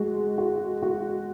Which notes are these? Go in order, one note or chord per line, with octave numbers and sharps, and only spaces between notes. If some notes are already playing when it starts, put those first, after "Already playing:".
Already playing: G#3 F#4
F#4
F#4